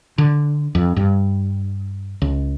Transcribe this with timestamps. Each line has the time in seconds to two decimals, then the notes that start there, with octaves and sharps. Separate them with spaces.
0.18 D3
0.75 F2
0.96 G2
2.22 C#2